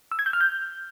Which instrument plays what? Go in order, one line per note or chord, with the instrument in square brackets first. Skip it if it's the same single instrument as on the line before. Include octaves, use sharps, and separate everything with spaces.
[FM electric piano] E6
G#6
G6
F6
G6